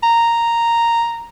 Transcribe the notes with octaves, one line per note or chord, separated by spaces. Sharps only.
A#5